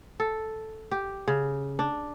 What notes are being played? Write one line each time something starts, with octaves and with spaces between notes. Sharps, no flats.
A4
G4
C#3
D4